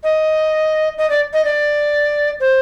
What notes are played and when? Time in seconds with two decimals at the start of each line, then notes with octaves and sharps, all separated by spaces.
0.04 D#5
0.98 D#5
1.10 D5
1.33 D#5
1.45 D5
2.41 C5